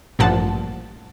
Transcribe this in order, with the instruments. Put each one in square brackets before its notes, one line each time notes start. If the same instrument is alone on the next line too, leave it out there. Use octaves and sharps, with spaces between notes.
[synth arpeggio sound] A1 G2 A#2 F3 F#5 A5